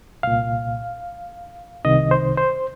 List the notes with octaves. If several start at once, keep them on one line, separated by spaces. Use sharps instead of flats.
C2 A#2 F5
C2 C3 D#3 D#5
C5
C5